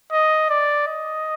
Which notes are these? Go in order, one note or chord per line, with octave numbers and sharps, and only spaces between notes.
D#5
D5
D#5